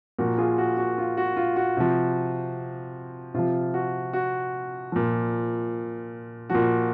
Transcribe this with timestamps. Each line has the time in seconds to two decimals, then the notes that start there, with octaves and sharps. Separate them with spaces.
0.18 A#2 F3 F#4 A#4
0.38 F4 G#4
0.58 F#4
0.77 F#4
0.98 F4
1.17 F#4
1.37 F4
1.56 F#4
1.77 C3 F3
3.34 C3 F3 F4
3.74 F#4
4.13 F#4
4.92 A#2 F3
6.50 A#2 F3 F#4